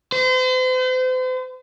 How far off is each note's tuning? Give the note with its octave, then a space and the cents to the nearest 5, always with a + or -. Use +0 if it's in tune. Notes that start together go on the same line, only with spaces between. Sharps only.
C5 -40